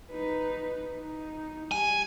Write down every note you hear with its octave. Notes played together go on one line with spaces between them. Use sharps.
D#4 B4
D#4
G3 G#5